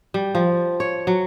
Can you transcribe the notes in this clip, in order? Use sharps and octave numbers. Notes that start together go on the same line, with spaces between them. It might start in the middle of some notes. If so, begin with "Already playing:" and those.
G3
F3
C#5
F#3